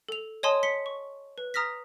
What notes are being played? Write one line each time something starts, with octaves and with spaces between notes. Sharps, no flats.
A4 F7
C#5 D#5 G#5 A5 C6 D#6
B6 C#7 G7
C#6
B4
A#5 D#6 F6 A#6 B6